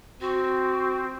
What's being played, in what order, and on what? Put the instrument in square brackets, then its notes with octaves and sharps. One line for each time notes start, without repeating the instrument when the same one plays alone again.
[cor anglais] C4 [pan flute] F#4